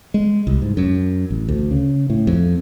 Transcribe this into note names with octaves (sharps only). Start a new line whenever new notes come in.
G#3
C2
G#2
F#2
A1
D2
C#3
A2
F2